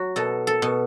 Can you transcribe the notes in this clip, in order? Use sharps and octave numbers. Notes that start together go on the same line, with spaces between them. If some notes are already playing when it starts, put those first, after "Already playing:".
Already playing: F#3 F#4
B2 A4
A4
B2